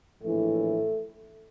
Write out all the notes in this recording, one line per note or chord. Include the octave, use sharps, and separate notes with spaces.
A#1 A2 E3 A3